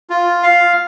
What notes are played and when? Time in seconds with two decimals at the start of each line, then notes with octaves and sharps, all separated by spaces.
0.10 F4
0.43 F5